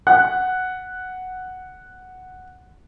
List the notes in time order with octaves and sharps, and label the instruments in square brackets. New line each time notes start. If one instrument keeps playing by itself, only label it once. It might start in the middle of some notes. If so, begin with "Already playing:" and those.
[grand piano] F#5 F#6